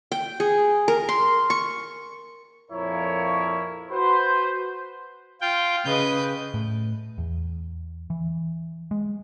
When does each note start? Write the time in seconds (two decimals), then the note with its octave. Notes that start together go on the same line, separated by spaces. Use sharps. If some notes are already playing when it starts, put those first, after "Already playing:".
0.12 G5
0.40 G#4
0.88 A#4
1.09 C6
1.50 C#6
2.71 F2 A#2 F3 E4 A#4 C#5
3.91 F#4 B4 C5
5.41 F4 G5
5.85 C#3 B4 D#5 G6
6.54 A2
7.18 E2
8.10 E3
8.91 G#3